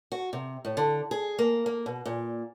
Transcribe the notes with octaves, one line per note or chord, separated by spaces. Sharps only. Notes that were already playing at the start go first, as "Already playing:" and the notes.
F#4
C3
A2
D3
G#4
A#3
A#3
B2
A#2